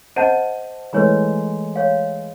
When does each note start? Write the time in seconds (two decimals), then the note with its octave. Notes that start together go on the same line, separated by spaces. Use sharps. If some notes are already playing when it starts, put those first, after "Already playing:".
0.16 C5 D#5 F#5 A5 G6 D#7
0.93 E3 G#3 A3 B4 C#5 A#5
1.76 C#5 F5